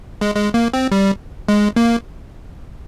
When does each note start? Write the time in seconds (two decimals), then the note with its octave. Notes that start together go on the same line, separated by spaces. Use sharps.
0.21 G#3
0.35 G#3
0.54 A#3
0.74 C4
0.92 G3
1.49 G#3
1.76 A#3